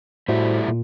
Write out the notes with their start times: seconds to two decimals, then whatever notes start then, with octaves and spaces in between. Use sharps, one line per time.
0.28 A2 G3 A3 E4 F#4 C5
0.68 A#2